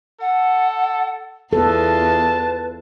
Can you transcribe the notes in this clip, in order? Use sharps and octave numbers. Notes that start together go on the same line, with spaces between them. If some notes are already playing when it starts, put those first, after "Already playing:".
A4 F#5
E2 F4 A4 B4 A5